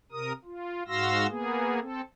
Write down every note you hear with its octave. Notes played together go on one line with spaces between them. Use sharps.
C3 A#4 D#6
F4
G#2 F#4 F5 C6 E6 A#6
A#3 B3 G#4
C4 A4